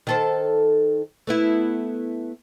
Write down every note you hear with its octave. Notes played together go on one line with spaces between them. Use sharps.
D#3 A4 C5
A3 B3 E4